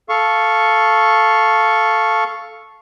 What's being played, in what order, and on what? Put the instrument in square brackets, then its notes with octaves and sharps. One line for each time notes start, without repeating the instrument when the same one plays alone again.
[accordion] A4 F5 C#6